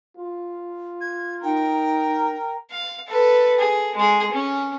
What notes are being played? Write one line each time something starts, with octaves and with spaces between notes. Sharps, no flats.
F4
G#6
D#4 A#4 G5
F5
A4 B4
G#4
G#3 G#4
C#4